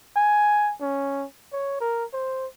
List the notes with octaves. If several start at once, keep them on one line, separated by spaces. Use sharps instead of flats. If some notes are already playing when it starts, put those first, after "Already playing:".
G#5
C#4
C#5
A#4
C5